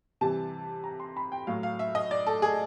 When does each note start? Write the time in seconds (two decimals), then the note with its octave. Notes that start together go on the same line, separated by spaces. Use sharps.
0.21 C3 E3 G3 A5
0.84 A#5
1.00 C6
1.17 B5
1.32 G5
1.47 A2 F#3 F5
1.63 F5
1.79 E5
1.95 D#5
2.11 D5
2.26 A4
2.42 G#4